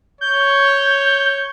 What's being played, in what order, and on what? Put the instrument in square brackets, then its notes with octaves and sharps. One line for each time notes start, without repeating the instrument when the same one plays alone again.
[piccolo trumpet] C#5 [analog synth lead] G6